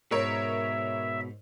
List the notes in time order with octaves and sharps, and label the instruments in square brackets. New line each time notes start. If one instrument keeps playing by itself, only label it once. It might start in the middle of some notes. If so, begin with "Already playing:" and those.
[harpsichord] G#2 [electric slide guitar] B2 [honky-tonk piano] A#4 C#5 [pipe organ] E5